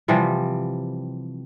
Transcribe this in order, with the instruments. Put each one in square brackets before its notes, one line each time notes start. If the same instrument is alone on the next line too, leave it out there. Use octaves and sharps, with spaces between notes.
[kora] C3 E3 F3 G3